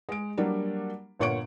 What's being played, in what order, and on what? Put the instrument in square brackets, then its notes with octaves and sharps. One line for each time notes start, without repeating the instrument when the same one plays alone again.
[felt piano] G#3 D7
F#3 G3 A#3 D4
G1 A#2 C#5 F#5 C#6 D7